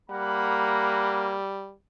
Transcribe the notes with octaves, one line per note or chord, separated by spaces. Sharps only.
G3 A#3 F#5 A#5 B5